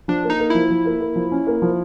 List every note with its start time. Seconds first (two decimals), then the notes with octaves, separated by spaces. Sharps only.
0.08 F3 D4
0.24 A#3
0.30 D#4
0.39 A#3
0.50 F3 E4
0.70 F3
0.86 A#3
1.01 A#3
1.16 F3
1.32 C#4
1.47 A#3
1.62 F3